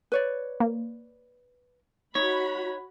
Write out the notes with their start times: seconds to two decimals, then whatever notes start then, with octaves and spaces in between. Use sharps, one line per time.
0.12 B4 C#5 D5
0.60 A#3
2.15 D#4 F#4 C#5 B5